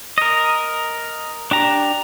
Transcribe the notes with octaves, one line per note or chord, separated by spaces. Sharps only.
A#4 D#5
D4 G4 A#5